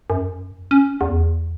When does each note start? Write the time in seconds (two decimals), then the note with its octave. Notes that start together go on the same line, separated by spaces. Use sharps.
0.10 F#2
0.71 C#4
1.01 E2